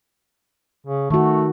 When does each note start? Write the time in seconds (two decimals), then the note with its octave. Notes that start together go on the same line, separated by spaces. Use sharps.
0.86 C#3
1.10 D#3 A3 F#4